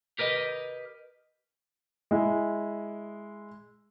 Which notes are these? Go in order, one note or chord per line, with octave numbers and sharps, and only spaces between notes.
G4 A#4 B4 D#5
G#3 E4